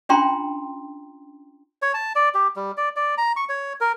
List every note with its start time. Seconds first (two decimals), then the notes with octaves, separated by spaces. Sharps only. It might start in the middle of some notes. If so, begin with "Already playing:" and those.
0.09 C#4 D4 F4 G5 A#5 C6
1.82 C#5
1.94 A5
2.15 D5
2.34 G4
2.56 G3
2.77 D5
2.96 D5
3.18 A#5
3.36 C#6
3.49 C#5
3.81 A#4